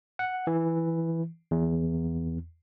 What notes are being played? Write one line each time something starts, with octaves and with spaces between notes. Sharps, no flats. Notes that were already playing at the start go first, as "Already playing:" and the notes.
F#5
E3
E2